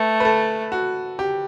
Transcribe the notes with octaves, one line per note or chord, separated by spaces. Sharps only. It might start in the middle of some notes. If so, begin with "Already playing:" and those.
Already playing: A3 B4
B4
A4
F#4
G4